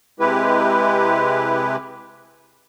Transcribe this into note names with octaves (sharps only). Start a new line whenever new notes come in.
C3 G#3 E4 G4 B4